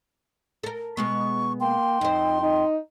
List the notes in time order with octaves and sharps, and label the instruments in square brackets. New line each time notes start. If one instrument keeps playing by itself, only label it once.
[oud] A4 A#4
[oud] B2 G#3 B3 [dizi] C#6
[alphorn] A#3 [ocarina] G5 [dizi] C6
[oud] F2 C5 [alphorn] D#4
[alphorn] D#4